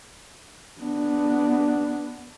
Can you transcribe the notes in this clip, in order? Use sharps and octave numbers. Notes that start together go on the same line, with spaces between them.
B3 D4